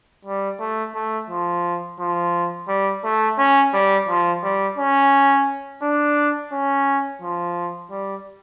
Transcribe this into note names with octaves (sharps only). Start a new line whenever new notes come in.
G3
A3
A3
F3
F3
G3
A3
C#4
G3
F3
G3
C#4
D4
C#4
F3
G3